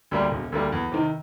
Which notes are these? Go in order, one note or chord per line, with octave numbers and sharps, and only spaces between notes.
D2 D3 G3 A#3
E1
D2 D3 G3 A#3
E2
C3 D#3